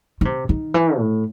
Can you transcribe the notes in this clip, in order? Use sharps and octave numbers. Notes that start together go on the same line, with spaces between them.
D#3
C3
D#3
E3
A2